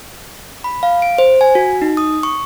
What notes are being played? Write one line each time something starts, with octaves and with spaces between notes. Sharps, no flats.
B5
F5
D7
C5
G#5
F#4
D#4
D#6
C#6